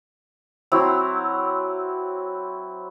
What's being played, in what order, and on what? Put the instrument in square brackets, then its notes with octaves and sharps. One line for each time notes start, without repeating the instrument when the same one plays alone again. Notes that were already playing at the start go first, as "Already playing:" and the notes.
[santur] F#3 C4 E4 E6